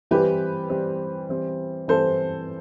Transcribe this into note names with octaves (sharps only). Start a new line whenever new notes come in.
E3 G3 C4 G4 B4
E3 G3 C4
E3 G3 C4
E3 G3 C4 A4 C5